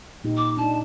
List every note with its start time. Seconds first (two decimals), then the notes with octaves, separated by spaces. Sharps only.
0.24 A#2 D#4 G4
0.37 D6
0.57 D4 D#4 A5